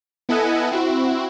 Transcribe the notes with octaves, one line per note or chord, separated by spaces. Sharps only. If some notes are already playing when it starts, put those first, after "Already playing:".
B3 E4 A4 D#5 F#5 G#5
C4 E4 F#4